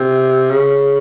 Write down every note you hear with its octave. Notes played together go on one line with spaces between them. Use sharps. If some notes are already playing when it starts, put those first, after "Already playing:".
Already playing: C3
C#3